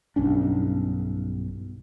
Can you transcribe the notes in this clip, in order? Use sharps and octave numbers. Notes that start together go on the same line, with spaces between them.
B1 G2 C#4 D4